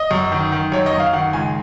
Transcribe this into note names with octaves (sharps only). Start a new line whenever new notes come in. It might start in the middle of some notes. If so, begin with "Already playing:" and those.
Already playing: D#5
F#2
D#3
D#3
F#2 C#5
D#5
F#2
F5
D#3 F#5
C#2 G#5